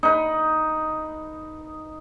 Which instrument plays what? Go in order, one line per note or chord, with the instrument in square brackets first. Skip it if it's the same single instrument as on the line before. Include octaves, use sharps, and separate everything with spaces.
[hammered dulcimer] D#4 B4